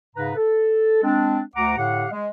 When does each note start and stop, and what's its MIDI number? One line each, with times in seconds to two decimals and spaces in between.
0.16 0.32 44
0.16 0.32 49
0.16 0.32 71
0.16 0.32 82
0.36 1.01 69
1.03 1.40 56
1.03 1.40 60
1.03 1.40 62
1.55 1.74 38
1.55 1.74 78
1.55 1.74 82
1.55 1.74 86
1.77 2.06 45
1.77 2.06 50
1.77 2.06 67
1.77 2.06 77
1.77 2.06 78
2.11 2.27 56